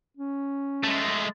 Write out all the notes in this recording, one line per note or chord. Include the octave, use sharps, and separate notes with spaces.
C#4
G#3 A3